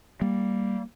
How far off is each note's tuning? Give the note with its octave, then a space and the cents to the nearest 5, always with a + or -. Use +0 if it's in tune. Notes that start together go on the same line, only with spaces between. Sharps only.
G3 +0 A#3 +0